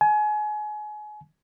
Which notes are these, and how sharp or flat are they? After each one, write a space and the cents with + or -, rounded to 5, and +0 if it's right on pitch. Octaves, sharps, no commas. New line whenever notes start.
G#5 +30